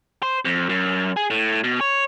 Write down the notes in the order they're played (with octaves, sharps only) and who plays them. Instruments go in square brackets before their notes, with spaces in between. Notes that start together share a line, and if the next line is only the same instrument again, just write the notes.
[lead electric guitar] C5
F2
F#2
G#4
A2
B2
C#5